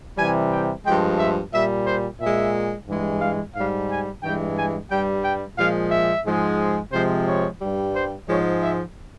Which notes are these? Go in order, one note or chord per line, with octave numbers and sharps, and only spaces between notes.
C3 E3 G3 G#5
G5
G2 F3 G#3 G5
E5
A#2 G3 E5
C5
A#2 G#3 E5
G2 E3 G#3
F5
G#2 G3 F5
G#5
G2 E3 G#3 G5
G#5
G2 G3 G5
G5
A#2 F3 G#3 F5
E5
G#2 F3 G#3
C3 F3 G#3 C5
C#5
G2 G3
C5
G#2 F3 G#3 C#5
E5